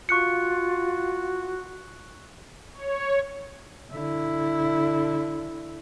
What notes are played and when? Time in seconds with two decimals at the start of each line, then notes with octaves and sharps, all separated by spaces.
0.09 F4 F#4 C#6 F#6 C#7
2.73 C#5
3.92 D3 E4